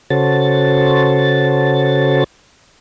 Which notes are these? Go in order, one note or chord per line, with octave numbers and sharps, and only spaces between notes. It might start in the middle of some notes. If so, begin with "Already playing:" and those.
C#3 F#4 A4 C5 C#5 A6